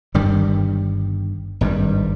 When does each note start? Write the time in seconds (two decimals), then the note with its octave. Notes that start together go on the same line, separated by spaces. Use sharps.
0.14 G1 G2 D#3 G3
1.61 G#1 G2 G3